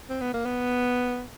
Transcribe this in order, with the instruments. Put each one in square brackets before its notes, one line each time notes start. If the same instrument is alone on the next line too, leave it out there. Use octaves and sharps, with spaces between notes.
[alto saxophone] C4
B3
A#3
B3